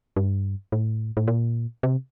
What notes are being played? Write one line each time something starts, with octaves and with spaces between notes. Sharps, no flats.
G2
A2
A2
A#2
C3